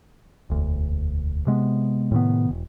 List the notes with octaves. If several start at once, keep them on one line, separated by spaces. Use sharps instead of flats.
E1 D2
C3 G#3 B3
A2 C3 D#3 B3
E1